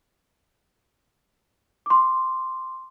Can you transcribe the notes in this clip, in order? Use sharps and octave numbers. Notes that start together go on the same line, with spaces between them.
C6 D6